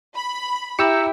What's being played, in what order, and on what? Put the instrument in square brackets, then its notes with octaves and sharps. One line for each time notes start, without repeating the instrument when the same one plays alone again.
[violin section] B5
[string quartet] E4 [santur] G4 [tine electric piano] A#5 E6 C#7